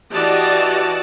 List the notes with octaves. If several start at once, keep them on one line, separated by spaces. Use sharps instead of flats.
E3 F#4 G4 D5 D#5 A5